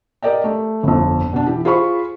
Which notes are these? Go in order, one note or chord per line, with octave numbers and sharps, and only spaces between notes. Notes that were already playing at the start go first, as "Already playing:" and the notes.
G4 A#4 D5 D#5 G5
A3
G1 F2
B2 D4
E3 G4
F4 G#4 C5 B5 C#6